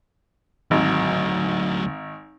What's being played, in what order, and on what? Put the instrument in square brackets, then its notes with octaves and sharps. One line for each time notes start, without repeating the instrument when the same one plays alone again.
[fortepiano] G#1 [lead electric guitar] D2 F#3